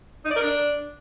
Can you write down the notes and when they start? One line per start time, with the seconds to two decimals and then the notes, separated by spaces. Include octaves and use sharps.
0.25 D#4
0.31 D5
0.36 A#4
0.42 D4